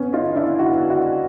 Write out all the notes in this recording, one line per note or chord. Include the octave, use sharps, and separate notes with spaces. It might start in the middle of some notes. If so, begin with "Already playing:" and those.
Already playing: B3 C#4
D#4 F4
D4 E4
E4 F#4
E4 F#4